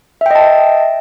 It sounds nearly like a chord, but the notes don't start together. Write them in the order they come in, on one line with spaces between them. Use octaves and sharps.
E5 G5 D#5 A5